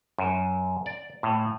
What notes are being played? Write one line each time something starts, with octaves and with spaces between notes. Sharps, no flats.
F#2
D5
A2